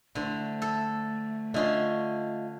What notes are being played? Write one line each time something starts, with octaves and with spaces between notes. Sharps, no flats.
D3 A3 E4 C5
A4
D3 C#4 F4 D#5 E5 C6